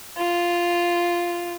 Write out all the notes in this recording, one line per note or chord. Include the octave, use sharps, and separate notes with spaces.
F4